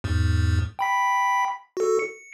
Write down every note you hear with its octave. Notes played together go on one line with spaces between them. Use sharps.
E2 G#2
G5 B5 B6
F#4 A4
C#7